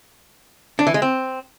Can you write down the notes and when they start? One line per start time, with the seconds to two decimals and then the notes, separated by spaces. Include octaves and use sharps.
0.79 D4
0.87 E3
0.94 G#3
1.02 C4